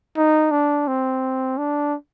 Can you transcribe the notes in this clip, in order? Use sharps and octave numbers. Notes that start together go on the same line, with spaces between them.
D#4
D4
C4
D4